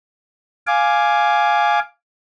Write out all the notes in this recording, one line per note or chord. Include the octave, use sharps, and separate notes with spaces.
F5 G#5 D6